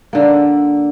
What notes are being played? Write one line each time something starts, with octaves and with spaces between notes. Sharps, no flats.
D3 A#3